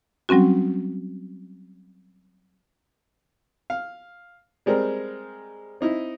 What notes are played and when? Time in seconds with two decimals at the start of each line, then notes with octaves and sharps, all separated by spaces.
0.29 F#3 G3 C4 C#4 F#4
3.70 F5
4.66 G3 G#3 C4 A#4
5.81 C4 D#4 E4